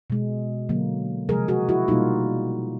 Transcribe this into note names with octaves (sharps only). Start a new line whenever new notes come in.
B2 G#3
D3 F#3 A#3
C3 F3 G#3 G#4 A#4
F#4 G#4
E4 F#4
B2 G3 A#3 D#4 F4